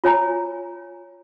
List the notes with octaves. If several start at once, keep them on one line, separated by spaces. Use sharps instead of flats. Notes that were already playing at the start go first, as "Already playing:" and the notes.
F4 C#5 G#5 A#5